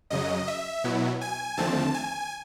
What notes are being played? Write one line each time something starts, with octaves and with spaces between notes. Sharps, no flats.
F#2 C#3 F#3 D#5
E5
B2 F#3 B3 E4
G#5
D#2 D3 F3 A3 C4 A5
G#5